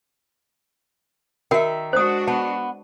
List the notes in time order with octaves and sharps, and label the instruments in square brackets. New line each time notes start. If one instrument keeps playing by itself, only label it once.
[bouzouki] D#3 E5 [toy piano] F#4 A#4 G5
[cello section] G#3 D4 F#4 [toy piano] C5 D#6
[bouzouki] B3 [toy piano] A5